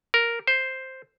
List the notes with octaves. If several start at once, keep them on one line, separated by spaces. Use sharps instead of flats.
A#4
C5